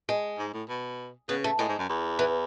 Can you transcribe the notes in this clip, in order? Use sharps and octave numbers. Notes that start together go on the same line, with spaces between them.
G#3
G#2
A2
B2
C#3 B3
A3
A2 G#3
G#2
F#2
E2
E3